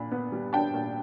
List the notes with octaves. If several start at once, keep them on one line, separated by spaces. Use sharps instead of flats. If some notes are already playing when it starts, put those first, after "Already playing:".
Already playing: A#2 D4 B5
B3
G3
D4 G5 A5
A#2